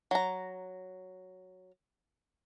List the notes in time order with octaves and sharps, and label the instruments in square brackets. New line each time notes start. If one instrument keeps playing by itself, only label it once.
[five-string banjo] F#3 A#5